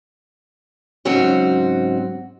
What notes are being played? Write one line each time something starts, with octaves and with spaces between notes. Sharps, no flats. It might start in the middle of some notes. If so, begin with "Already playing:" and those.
G#2 C#3 F#3 C4 F#4 C#5